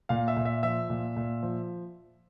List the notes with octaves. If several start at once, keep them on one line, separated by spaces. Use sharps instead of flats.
A#2 F5
E5
A#2
E5
F3 E5
A#2
A#2
F3